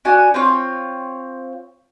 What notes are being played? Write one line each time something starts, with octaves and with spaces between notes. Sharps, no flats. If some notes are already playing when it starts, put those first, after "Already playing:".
D4 F#4 G#5
C4 F4 C#5